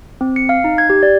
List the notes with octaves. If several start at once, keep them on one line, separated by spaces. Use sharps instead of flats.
C4
C#7
F5
D#4
G#6
G4
D5